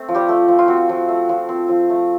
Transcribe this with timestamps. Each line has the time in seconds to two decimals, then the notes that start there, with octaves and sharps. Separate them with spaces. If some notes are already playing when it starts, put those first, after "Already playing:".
Already playing: A3 C4
0.09 F3
0.15 G3 G4
0.29 A3
0.48 F3
0.59 F4
0.68 C4 F#4
0.89 F3
1.09 A3
1.29 F3
1.49 C4
1.69 F3
1.90 A3